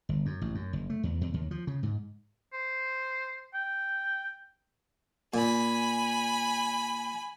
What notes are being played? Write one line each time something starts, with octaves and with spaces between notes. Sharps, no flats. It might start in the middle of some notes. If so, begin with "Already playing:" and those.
G1
F#2
A1
F#2
F#1
A3
E2
E2
D#2
F3
C#3
G#2
C5
G5
A#2 G#5 B5